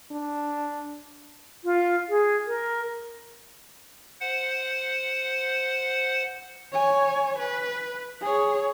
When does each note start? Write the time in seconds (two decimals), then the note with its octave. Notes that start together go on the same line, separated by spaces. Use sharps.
0.12 D4
1.63 F4
2.09 G#4
2.47 A#4
4.21 C5 F#5
6.72 C#5 G#5
7.39 B4
8.22 G#4 C#5